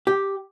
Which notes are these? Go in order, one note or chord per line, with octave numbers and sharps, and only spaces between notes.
G4